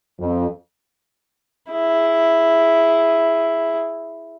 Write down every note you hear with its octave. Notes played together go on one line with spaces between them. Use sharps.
F2
E4 G#4